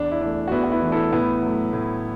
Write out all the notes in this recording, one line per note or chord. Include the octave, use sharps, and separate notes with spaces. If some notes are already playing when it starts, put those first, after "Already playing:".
Already playing: E2 D4
E4
E3 A3 D4
F#4
E2 B3 E4
F#4
B3 E4
E3 A3
E4 A4
A2 B3 E4
F#3 A3
A2